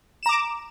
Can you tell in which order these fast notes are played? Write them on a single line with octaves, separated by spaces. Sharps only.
E7 A#5 D6